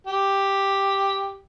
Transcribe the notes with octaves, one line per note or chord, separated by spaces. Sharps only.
G4